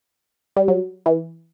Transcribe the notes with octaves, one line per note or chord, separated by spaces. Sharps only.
G3
F#3
E3